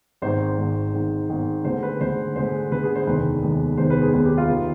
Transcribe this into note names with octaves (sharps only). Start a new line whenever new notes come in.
G#1 G#2 D#3 C5
G#1 G#2 D#3
G#1 G#2 D#3
G#1 G#2 D#3
D2 D3 G#3 C5
B4
D2 D3 G#3 C5
D2 D3 G#3 C5
D2 D3 G#3 B4
G#4
C5
F1 D#2 D#3 G#3 B3 B4
F1 D#2 D#3 G#3 B3
F1 D#2 D#3 G#3 B3 C5
B4
G#4
F1 D#2 D#3 G#3 B3 B4
G4
F4
G1 D#3 B3